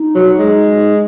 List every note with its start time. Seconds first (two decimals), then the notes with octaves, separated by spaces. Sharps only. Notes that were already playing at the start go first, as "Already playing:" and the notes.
Already playing: D#4
0.15 F#3
0.39 G#3